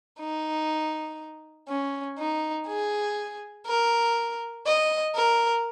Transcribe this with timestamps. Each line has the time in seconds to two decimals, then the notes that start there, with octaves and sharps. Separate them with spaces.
0.20 D#4
1.69 C#4
2.19 D#4
2.68 G#4
3.67 A#4
4.67 D#5
5.15 A#4